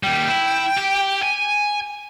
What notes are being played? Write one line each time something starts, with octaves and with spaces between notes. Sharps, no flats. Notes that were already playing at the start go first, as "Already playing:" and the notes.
D#2 G3 G5
E4
G4
G#5